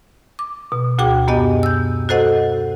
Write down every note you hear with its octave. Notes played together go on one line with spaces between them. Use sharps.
D6
B2
D2 F#4 G#4 G5 D6
F#2 B3 G4 D#5 G#5
E6 G6
F#4 A4 C5 D#5 F#5